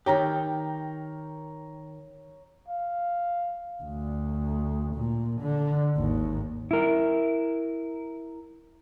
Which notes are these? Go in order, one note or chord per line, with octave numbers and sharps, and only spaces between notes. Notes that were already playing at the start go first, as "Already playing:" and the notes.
D#3 G4 C#5 A#5
F5
D2
A#2
D3
G#1 D#2
E4 A#4